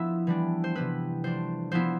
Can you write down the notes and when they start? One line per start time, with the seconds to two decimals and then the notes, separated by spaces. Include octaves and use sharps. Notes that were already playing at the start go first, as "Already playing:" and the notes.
Already playing: F3 B3 D4 E4 E5
0.27 E3 G3 D4
0.64 C5
0.75 C3 G3 B3 E4 B4
1.24 F3 A3 D4 C5
1.72 F3 B3 E4 C5